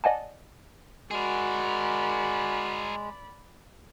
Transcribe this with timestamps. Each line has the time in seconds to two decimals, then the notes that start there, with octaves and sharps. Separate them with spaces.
0.04 D5 D#5 F#5 G#5 A5
1.11 G#3 F#4 G#4 A#4 D5 B5